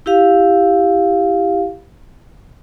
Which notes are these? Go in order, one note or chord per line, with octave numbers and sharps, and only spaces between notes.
E4 G4 F5